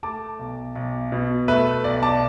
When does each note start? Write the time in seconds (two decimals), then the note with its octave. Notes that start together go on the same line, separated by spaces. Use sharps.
0.03 A3 A5 D6
0.39 B1
0.75 B1
1.12 B2
1.48 A3 B4 E5
1.84 B1 D5
2.03 A5 D6